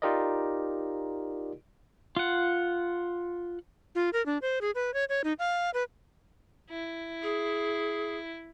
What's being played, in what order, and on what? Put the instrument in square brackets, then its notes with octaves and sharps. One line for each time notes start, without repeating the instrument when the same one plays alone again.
[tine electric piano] D#4 F4 G4 A#4 D5 D#5
[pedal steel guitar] F4 F#5
[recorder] F4
A#4
D4
C5
G#4
B4
C#5
C#5
D#4
F5
B4
[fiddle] E4
[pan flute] G#4